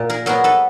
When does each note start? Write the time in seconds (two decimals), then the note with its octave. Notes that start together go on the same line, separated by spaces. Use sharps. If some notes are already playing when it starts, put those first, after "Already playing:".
Already playing: A#2
0.10 G#4 A#4
0.26 F#3 B3 G#4 A#4
0.44 A4 B4